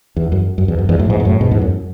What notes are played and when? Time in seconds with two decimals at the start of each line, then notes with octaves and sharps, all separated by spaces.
0.16 E2
0.32 F#2
0.58 F#2
0.68 E2
0.79 F#2
0.89 E2 G#2
0.99 F#2 A2
1.10 E2 G#2
1.20 B2
1.25 F#2 A2
1.41 G#2 B2
1.51 E2 G#2
1.62 F#2